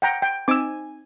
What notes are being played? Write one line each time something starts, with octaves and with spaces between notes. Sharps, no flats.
F#5 G5 A#5
G5
C4 D#4 G#5 D6 E6